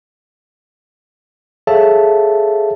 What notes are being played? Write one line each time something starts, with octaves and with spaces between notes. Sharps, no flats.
G#4 A4 C#5 E5 F5 A5